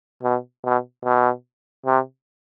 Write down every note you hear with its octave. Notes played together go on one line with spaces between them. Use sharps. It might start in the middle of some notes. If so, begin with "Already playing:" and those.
B2
B2
B2
C3